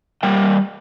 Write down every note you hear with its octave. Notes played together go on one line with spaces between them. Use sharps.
G3 A#3 G5